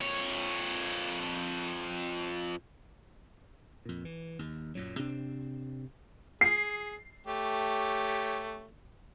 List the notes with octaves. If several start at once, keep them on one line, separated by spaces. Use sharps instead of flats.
F2 C#5
F2 A#2
E3
D#2
F#2 A#2 F#3
C3 C4 D4
G#4 C7
A3 G4 C#5